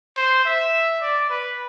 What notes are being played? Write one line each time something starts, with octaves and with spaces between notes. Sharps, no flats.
C5
E5
D5
B4